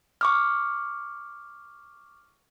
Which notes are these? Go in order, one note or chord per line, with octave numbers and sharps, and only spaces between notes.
C#6 D6 F6